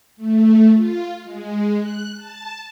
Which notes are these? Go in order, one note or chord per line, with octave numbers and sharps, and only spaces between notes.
A3
F4
G#3
F#6
A5